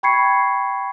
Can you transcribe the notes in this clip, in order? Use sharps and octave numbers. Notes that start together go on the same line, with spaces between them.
G5 B5 C#6 G#6 C7 C#7